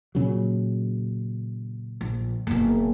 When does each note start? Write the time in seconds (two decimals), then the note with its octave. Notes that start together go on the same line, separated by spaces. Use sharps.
0.15 A#2 C#3 F#3
2.01 A#1
2.47 F#1 B2